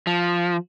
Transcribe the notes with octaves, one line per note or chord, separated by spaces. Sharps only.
F3